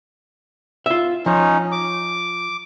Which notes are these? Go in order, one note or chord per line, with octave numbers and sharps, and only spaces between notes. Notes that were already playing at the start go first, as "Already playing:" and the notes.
F4 E5
F3 C#4 D#4
D6